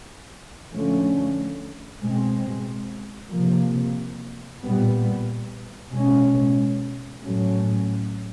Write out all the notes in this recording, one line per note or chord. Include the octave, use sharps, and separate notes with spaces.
D3 F3 A3 C#4
B2 G#3 C4
C3 F3 A#3
A#2 G3 B3
B2 G#3 C#4
A2 F#3 A3 C#4